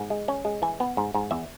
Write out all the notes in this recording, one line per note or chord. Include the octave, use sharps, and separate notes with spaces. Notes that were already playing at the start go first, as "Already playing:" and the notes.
Already playing: G#2
G#3
C#4
G#3
E3 G#5
B3
G#2
G#2
E2 E5